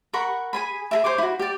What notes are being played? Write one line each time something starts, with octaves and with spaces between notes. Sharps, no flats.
A#4 F#5 B5 C#6
G#4 G#5 B5
G#4 A#4 E5
C5 C#5 G#5 D6
E4 F#4
G4 D5